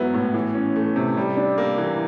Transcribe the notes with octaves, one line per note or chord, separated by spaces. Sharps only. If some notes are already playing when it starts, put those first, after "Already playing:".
Already playing: G#2 F#3 B3 E4
A2
E3
C#4
A3
C3
G3
D4
A#3
E3